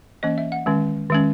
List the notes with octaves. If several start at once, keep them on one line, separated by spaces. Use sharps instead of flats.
E3 A#3 C#4 D#5
E5
F#5
D#3 G#3 C#4
D#3 G#3 C#4